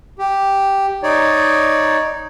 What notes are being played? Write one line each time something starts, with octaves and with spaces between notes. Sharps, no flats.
G4
D#4 C#5 D5